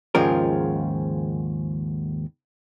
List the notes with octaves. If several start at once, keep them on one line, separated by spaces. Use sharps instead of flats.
D#2 G#2 C#3 F3 F4 A#4